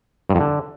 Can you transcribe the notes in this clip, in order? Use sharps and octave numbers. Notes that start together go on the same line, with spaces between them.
G2
F2
D3